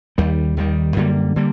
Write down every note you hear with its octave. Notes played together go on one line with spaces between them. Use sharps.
D#2 D#3 G3
D#2 D#3 G3
F#2 D3 G3 A#3
D3 G3 A#3